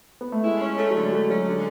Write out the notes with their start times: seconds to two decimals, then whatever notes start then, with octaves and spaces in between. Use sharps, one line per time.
0.21 B3
0.32 A3
0.44 G#3 E4
0.61 C#4
0.79 A3
0.90 F#3
0.96 D3 G#3
1.13 F#3 A3
1.30 F#3 C#4
1.47 D3 G#3